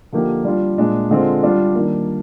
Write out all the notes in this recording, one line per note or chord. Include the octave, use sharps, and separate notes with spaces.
D3 F3 A#3 D#4 G4
G3 D4 F4
A#2 G#3 D4
D3 G#3 C4 F4
G3 D4 F4
D#3 G3 A#3 D4